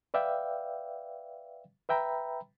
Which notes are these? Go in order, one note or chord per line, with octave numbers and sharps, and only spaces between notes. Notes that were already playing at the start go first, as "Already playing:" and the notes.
B4 D5 E5 F5 G5
B4 E5 G5 A#5 B5